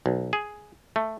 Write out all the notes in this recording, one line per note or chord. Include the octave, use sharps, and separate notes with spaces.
B1
G#4
A3